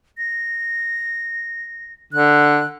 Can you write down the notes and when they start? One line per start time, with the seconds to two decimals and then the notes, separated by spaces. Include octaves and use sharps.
0.18 A#6
2.13 D3 F#6